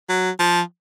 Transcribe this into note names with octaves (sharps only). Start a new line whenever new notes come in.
F#3
F3